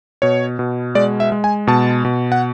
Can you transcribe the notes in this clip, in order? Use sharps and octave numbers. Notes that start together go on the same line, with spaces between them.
B2 C#5
B2
G#3 D5
E5
G#3
G#5
B2 A5
B2
F#5